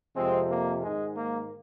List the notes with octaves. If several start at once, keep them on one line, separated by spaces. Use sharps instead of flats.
F2 C3 F3 G#3 C4
A#3
G#2 D#3 G#3
A#3